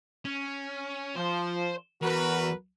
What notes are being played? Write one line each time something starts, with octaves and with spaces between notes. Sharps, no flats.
C#4
F3 C5
E2 F#4 A#4 B4